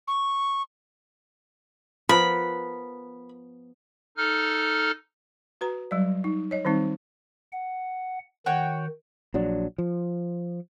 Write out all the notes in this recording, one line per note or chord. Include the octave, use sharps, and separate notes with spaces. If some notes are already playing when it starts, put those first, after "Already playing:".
C#6
F3 B3 A#4 B5
D#4 A4 F6
F#4 B4 A#5
F#3 G3 D5
D#4
C#5 D#5
D#3 G3 C4 D#4
F#5
D#3 F#4 C#5 G5
A#1 F#3 D4
F3